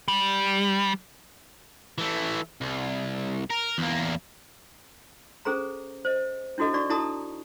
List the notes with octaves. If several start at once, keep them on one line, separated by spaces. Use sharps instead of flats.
G3
E3 A3
C2
A#4
E2 A#3
C#4 G#4 A4 C5 A#5
C5 D#5
D4 E4 F#4 A4 D#5
D#4 F#4 D5 C#6
E4 F#4 A4 A5 A#5 D#6